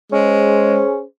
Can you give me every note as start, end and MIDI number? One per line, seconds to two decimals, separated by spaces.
0.12 0.81 56
0.12 1.03 61
0.12 1.03 68
0.12 1.03 72